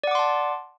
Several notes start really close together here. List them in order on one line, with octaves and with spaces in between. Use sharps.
D5 F#5 D6 C6 A5